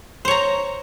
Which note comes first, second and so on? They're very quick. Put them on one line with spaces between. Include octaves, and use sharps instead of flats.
C5 C#5 A#5